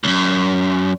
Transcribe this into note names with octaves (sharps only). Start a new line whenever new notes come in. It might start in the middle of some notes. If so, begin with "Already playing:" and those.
C#2 F#2